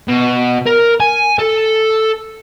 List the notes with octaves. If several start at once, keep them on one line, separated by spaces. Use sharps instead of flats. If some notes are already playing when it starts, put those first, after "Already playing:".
B2
A#4
G#5
A4